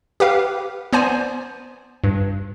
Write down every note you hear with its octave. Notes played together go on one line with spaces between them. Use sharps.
G4 B4 F5
B3 C5 D5 G#5
G2